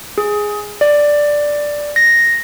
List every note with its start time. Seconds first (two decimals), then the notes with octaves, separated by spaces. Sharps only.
0.18 G#4
0.81 D5
1.96 A#6